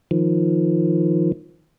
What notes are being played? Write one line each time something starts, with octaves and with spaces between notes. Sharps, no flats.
D#3 F3